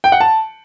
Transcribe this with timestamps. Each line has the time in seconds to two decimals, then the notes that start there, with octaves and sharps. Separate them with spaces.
0.04 G5
0.12 F#5
0.20 A5